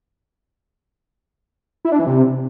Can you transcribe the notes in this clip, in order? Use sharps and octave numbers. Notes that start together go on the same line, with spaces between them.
E4
D4
E3
C3